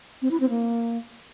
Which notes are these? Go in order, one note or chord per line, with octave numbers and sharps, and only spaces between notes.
C4
E4
C4
A#3